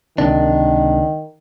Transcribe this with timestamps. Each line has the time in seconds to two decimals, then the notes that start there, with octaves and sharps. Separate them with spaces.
0.18 C#2 C3 D#3 D4